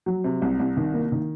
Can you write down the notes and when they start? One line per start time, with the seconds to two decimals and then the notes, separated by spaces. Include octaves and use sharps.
0.06 F#3
0.24 C3
0.42 C2
0.60 C2
0.77 D#3
0.94 A#3
1.12 D#3